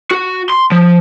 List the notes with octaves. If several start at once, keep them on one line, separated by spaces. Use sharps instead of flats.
F#4
C6
F3